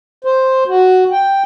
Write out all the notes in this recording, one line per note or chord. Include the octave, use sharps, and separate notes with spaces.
C5
F#4
G5